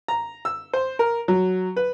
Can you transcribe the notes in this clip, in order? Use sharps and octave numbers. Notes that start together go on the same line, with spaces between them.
A#5
E6
C5
A#4
F#3
B4